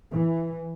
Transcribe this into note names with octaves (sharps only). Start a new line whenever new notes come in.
E3